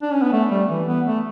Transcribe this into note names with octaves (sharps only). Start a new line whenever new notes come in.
D4
C#4
B3
A3
G3
E3
B3
A3